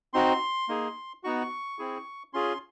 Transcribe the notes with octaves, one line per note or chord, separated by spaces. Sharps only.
C4 D#4 F#4 C6
A#3 D#4 G#4
B3 D#4 F#4 C#6
C4 E4 G#4
C#4 F4 G#4 C6